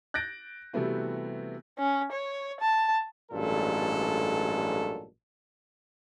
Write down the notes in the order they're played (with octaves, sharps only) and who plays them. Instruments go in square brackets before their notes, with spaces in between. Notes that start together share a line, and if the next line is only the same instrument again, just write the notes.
[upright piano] F#6 G6 A6 A#6 D7
C3 E3 G3 A3 B3 F#4
[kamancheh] C#4
C#5
A5
[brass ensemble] A1 G2 A#2 F#3 G#3 A4